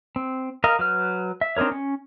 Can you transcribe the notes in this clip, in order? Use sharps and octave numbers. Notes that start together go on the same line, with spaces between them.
C4
A#4 D#5 F5
F#3 B4 F6
E5
C4 D4 D#4 A#4 C#5
C#4